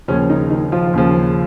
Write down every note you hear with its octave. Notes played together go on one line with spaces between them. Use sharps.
D#2 C#3 F3 C#4
D#3 D#4
D#3 D#4
F3 F4
D#2 C#3 F3